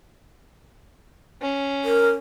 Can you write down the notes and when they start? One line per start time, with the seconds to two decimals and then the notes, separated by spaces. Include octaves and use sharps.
1.42 C#4
1.84 A#4